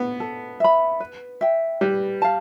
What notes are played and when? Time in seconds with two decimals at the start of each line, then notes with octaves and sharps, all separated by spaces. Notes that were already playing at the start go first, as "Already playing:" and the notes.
Already playing: B3
0.20 A4
0.60 E5 B5
1.00 B4
1.41 E5 G5
1.81 G3 B4
2.22 F5 A5